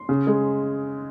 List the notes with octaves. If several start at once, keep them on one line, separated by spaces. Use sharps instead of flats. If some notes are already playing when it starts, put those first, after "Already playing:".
Already playing: C6
C#3
G#3